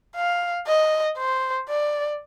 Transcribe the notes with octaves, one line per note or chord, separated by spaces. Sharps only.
F5
D#5
C5
D5